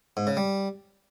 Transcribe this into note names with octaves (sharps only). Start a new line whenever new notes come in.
G#2
C#3
G3